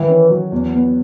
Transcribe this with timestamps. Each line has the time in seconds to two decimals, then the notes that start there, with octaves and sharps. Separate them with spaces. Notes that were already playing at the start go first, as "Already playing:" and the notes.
Already playing: D#3 E3
0.08 C#4
0.30 F#3
0.52 E2
0.73 B3